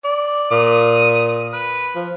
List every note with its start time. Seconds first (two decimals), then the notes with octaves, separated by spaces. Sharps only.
0.04 D5
0.51 A#2 D#6
1.53 B4
1.95 F3